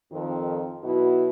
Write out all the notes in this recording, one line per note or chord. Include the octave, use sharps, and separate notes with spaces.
F2 D#3
B2 F#3 E4 F#4